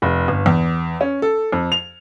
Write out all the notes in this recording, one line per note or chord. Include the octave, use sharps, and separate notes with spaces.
F1
G1
E2
C#4
A4
F2
F7